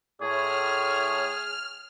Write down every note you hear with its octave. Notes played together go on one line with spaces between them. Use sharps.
A2 G#4 C#5 F6